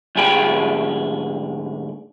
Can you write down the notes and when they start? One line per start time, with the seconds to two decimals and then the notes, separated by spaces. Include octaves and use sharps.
0.16 D2 G#2 G4 G#4 G5 B5